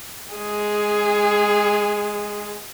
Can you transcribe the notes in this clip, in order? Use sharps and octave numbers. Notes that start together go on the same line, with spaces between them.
G#3 G#4